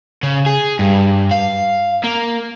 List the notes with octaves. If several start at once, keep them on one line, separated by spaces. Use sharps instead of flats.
C#3
G#4
G2
F5
A#3